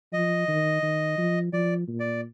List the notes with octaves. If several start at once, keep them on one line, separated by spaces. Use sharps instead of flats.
F3 D#5
D#3
D#3
F3
F3 D5
A#2
D5